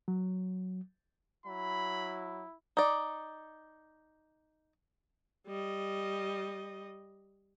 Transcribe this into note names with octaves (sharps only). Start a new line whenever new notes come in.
F#3
F#3 E4 B5
D#4 D5
G3 D#5